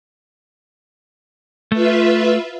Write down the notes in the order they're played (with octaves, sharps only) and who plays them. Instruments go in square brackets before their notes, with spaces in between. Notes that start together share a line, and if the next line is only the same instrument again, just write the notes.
[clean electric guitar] A3 [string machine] F4 B4 E5